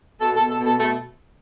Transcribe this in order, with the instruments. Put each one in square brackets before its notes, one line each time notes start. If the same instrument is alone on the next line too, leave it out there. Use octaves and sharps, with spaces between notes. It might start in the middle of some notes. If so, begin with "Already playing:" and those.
[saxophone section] B2 A4
A4
B2
A4
B2
A4
B2 A3 A4